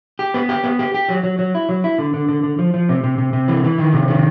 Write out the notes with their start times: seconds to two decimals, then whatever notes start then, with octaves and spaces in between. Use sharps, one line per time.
0.19 G4
0.34 B3
0.49 G4
0.64 B3
0.79 G4
0.94 G4
1.09 F#3
1.23 F#3
1.39 F#3
1.55 E4
1.69 F#3
1.84 E4
1.99 D3
2.14 D3
2.29 D3
2.43 D3
2.59 F3
2.74 F3
2.89 C3
3.04 C3
3.18 C3
3.33 C3
3.48 E3
3.64 E3
3.78 D#3
3.93 C3
4.08 D#3